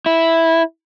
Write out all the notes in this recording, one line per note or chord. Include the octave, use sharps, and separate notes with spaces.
E4